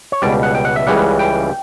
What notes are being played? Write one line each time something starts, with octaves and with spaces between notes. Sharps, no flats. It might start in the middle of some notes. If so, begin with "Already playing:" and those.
C#5
C#2 B2 G3 D5
F#5
G5
F#5
E5
C#2 C#3 E3 G3 F#5
G5